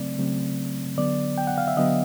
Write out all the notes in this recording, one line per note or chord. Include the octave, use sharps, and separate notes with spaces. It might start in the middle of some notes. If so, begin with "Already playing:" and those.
Already playing: C#3 F#3 A3 C4 D5
C#3 F#3 A3 C4
D3 F#3 B3 D5
G5
F#5
F5
E5
D3 F#3 B3 D#5